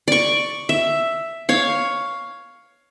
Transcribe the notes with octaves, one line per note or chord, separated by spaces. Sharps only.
D5 C#6
E5
C#5 F5